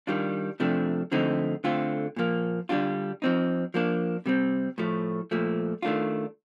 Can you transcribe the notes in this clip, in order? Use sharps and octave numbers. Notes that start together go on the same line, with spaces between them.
D#3 G3 D4 F4
C3 F3 A3 D4
D3 F3 A3 C4 D#4
D3 A3 C4 F4
A#2 F3 A#3
D3 G3 D4 F4
F3 C4 D#4
F3 A#3 D4
C3 G3 C4
A2 F3 A3
A#2 F3 A3
D#3 A3 D4 F4